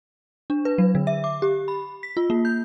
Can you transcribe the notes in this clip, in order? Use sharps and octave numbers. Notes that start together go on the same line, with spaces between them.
D4
B4
F#3
D3
E5
D6
G4
B5
B6
F4
A#3
G6